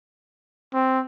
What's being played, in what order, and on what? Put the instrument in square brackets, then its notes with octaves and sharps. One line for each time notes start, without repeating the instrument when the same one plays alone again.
[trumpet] C4